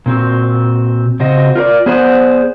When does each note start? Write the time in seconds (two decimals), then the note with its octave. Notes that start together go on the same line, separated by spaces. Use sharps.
0.06 A#2 C4 F#4
1.20 C#3 C4 F#4 D#5
1.56 F4 A#4 C5 D5
1.86 B3 G#4 C5 D5 E5 F#5